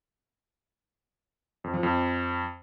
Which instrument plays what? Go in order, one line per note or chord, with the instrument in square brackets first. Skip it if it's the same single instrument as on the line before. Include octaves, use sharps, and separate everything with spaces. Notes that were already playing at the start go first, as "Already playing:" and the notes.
[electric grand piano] F2
F3
F2